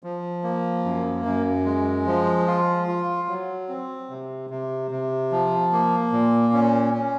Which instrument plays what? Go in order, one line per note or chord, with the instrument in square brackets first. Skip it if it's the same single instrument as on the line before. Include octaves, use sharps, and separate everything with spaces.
[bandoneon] F3
A#3
F#2
F#2
G#3
F3
F4
F4
F#3
C4
C3
C3
C3
F3
A#3
A#2
C#4
C#4